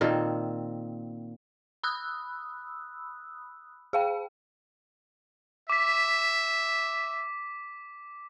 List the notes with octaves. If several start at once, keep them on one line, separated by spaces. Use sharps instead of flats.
A#2 D#3 C4 A4
B5 D#6 E6 F#6
G#4 F5 G5
E5 D6 B6